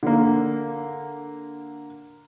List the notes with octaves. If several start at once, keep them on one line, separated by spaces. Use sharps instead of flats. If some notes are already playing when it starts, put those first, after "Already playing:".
D3 A#3